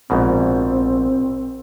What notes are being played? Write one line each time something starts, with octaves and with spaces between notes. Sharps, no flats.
A#1 G#2 B2 C4